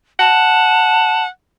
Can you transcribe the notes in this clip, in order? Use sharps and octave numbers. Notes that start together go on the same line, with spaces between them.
F#5 A5